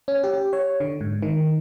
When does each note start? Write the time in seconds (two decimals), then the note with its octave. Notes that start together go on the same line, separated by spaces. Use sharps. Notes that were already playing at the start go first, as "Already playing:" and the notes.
0.08 C#4
0.24 G4
0.53 C#5
0.80 D3
1.01 G#2
1.22 D#3